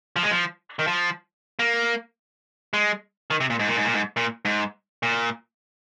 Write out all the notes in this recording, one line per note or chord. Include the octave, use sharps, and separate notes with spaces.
F3
G#3
F3
D#3
F3
A#3
G#3
D#3
C3
A#2
G#2
A#2
G#2
A#2
G#2
A#2
G#2
A#2